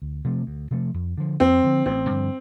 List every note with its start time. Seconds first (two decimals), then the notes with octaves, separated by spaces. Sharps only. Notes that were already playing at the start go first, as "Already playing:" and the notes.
0.02 D2
0.24 C3 F3 A3
0.47 D2
0.71 C3 F3 A3
0.94 F2
1.17 D3 F3
1.40 F2 C4
1.63 D3 F3
1.86 A1 C4
2.10 G2 D3 F3